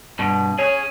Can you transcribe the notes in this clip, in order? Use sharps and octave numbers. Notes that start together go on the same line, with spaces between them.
G2 B2
C#4 G#4 C#5